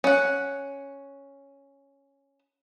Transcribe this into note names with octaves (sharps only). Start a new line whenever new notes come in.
C#4 F#5